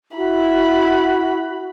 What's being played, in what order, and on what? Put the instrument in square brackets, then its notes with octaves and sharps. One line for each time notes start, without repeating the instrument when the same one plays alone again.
[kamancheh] E4 B5 [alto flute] F#4